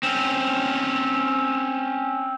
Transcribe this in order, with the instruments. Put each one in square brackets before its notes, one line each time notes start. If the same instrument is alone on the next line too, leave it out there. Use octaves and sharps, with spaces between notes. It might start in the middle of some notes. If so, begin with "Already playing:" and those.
[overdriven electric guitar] C4 C#4